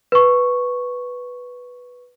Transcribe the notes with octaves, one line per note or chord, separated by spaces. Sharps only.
B4 C#6